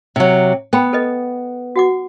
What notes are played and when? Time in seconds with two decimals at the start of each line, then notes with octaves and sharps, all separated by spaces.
0.16 C3 F#3
0.73 B3 G5 B5
0.93 A4 B4 D#5
1.76 F#4 F#5 D6